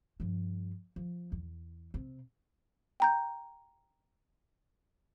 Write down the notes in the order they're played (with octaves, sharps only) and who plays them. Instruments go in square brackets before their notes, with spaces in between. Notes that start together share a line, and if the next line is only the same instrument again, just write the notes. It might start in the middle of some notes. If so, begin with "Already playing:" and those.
[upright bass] G2 F3
F3
E2
C3
[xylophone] G5 A#5 G6